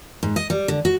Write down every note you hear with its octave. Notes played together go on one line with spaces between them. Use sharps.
G#2
D#5
G3
D3
F#4